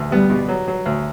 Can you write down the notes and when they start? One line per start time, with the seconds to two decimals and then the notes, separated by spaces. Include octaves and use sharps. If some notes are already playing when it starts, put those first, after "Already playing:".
Already playing: D2
0.11 G3 B3
0.30 B2
0.49 F#3
0.68 F#3
0.86 D2